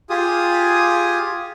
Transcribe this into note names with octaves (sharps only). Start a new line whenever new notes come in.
F4 G4 G#4 D#6